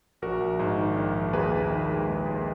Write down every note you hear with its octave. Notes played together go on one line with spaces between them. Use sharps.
A#1 F#4 A#4
A#1
G#2
D#3
A#1
A#1
D#2 G#4 B4
D#2
D#3
G#3
D#2
D#2